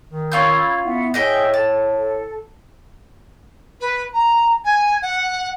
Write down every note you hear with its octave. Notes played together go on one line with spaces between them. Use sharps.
D#3
C#4 F4 B5 E6 G6 G#6
B3 E4 E5 F#5
A2 G#4 D#5 E5 G5
A4 A5
A4
B4
A#5
G#5
F#5